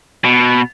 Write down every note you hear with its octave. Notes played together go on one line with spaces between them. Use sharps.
B2